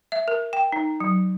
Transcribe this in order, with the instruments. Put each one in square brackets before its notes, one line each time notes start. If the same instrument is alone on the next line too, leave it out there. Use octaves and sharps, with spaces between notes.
[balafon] E5
A#4
G5
D#4
F#3